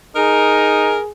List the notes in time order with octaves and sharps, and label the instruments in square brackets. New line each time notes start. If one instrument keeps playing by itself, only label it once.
[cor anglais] D#4 [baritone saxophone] G#4 [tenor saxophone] A#4